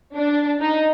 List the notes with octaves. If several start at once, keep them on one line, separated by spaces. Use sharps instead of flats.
D4
D#4